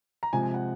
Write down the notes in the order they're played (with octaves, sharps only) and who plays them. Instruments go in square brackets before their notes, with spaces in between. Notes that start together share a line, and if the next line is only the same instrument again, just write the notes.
[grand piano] A#5
C3 F3 G#3 G#5
G#5
F#5